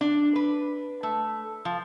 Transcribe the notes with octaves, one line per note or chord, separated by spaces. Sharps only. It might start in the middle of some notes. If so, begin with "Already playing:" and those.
D4
B4
A3
F3